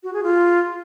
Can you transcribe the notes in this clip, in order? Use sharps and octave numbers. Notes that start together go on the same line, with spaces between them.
F#4
G#4
F4